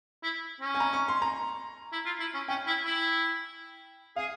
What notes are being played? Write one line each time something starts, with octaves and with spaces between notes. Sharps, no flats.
E4
C#4
G#5
A#5
C#6
C6
A#5
E4
F4
E4
C#4
C#4 G5
E4
E4
G#4 F5